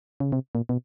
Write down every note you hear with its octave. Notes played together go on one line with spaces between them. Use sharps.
C#3
C3
A#2
B2